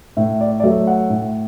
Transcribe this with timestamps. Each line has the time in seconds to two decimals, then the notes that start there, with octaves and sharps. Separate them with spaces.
0.17 A2 E5
0.41 D5
0.60 D5
0.63 F#3 A3 E5
0.87 F#5
1.10 A2